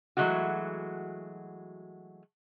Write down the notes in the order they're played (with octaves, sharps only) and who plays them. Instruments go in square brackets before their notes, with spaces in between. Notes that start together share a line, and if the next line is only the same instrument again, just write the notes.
[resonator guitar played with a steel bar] E3 F#3 G#3 A3 F#4